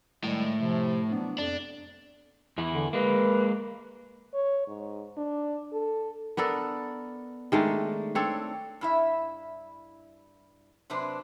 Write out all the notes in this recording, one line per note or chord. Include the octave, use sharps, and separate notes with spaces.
A2 D#3 G3 G#3
C3 F3
F#3 B3 D4
F2 D4
E2 E3 E4
D3
G#3 A#3 B4
C#5
G#2
D4
A4
B3 D4 A4 A#4
D#3 G#3 A3 D4
C4 D4 A4 C#5
G2 E4 E5
C3 F#3 D4 B4 C5